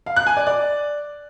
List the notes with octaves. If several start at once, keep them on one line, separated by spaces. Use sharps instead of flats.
F5
F#6
G#5
D5
D5